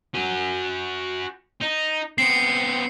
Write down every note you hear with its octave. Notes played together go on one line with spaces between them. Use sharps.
F#4 G#5
D#4
B3 C4 C7 C#7